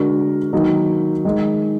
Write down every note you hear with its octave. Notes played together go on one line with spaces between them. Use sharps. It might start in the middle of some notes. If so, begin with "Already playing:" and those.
Already playing: D3 G#3 D4 F#4 A#4
D#3 F#3 A#3 D#4 A#4
D#3 G#3 D#4